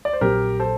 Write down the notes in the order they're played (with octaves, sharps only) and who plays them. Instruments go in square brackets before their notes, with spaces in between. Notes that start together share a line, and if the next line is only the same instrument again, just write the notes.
[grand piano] D5
C5
[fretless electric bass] A#1 A#2 F#3 C4 [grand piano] G4 A#4
[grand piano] A4 C5